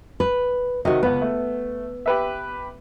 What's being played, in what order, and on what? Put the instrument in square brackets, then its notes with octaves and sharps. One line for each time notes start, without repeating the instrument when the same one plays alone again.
[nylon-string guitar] B4
[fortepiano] C3 D#3 [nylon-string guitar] F#4 D#5
[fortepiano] C#2 B4 [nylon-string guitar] B3
[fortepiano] A3
G4 B4 E5